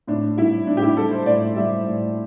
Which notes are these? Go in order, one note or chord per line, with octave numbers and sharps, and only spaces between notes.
A2 D4
G3 E4
A2 D4
G4
E4
G3 A4
C5
A2 D5
G3 E5
A2